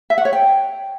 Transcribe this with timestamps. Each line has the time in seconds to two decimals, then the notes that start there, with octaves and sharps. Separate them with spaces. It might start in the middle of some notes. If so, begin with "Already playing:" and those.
0.10 E5
0.18 F#5
0.25 C#5
0.33 G5